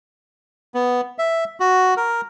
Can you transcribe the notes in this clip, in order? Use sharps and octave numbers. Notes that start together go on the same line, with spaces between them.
B3
E5
F#4
A#4